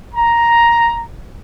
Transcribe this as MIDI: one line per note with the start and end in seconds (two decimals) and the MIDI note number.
0.13 1.03 82